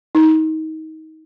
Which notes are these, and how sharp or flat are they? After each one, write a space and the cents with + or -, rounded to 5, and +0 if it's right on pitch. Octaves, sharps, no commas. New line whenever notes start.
D#4 +25